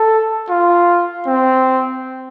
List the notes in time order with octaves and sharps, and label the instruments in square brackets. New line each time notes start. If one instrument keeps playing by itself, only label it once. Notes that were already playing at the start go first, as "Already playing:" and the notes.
Already playing: [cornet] A4
F4
C4